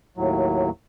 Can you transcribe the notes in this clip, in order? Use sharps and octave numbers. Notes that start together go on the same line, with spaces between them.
D#2 A2 F#3